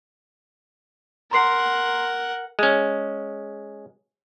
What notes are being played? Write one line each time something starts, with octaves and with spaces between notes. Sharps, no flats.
A#4 F#5 A#5 C6 C7
G#3 C#4